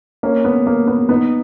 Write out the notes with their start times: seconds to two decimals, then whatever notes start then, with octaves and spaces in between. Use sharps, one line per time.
0.23 A#3 C#4
0.45 B3
0.66 A#3
0.87 B3
1.09 B3 D#4